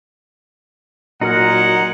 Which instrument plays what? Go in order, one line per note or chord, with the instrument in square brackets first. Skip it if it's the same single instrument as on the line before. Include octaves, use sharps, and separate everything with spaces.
[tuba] A#2 [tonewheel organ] F#3 F#4 [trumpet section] G#3 F#5 [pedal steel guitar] D#4 A#4 F6